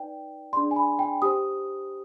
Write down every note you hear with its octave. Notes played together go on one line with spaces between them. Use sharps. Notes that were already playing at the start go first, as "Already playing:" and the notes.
Already playing: D#4 B4 D5 G5
D4 G#4 D5 C6
G#5
B5
G5
G4 C5 D#6